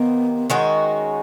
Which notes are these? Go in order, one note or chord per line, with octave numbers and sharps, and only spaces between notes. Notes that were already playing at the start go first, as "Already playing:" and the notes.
Already playing: C3 D#3 A#3 B3
D#3 G#3 C#4 F#4